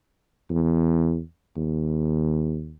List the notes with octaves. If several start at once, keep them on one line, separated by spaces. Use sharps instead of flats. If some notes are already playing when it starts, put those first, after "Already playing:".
E2
D#2